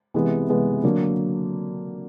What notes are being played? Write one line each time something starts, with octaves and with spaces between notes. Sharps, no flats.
C3 E3 G#3 B3
C3 E3 G#3 B3
D3 F#3 A#3